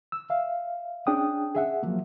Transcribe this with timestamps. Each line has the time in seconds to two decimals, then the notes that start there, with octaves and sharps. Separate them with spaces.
0.12 E6
0.30 E5 F5
1.07 C#4 D4 G#4 G5 D#6
1.55 G#4 E5 F#5
1.83 F3 F#3 A#3